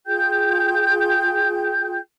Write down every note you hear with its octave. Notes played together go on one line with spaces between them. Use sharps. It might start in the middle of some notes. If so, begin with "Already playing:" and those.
F4 G#4 G5 G6